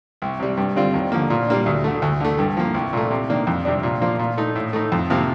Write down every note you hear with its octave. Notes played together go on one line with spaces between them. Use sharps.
C2
C3 G3
G2
D3 G3 C4 F4
D#2
D3 F3 A#3
A#2
G3 A#3 D4
D2
D3 A3
D2
D3 A3
G2
F3 A#3
C2
A#2 A3
C3
D#3 A#3 D4
F2
C3 G3 D4
A#2
F3 A#3 F4
A#2
A3 D#4
A2
A3 D#4
F2
C3 F3 A#3